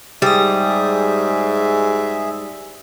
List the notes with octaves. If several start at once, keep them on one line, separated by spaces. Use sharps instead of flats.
G#2 G3 G4 G#4 E5 D#6